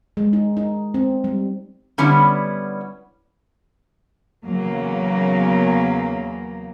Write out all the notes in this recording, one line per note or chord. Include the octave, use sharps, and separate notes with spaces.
G#3
D#4
D#4
C4
G3
D3 G3 B3 C#4 E4
E2 C#3 F#3 A#3